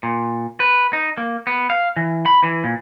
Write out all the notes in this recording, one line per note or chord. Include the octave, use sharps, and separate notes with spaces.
A#2
B4
D#4
A#3
B3
F5
E3
B5
E3
A#2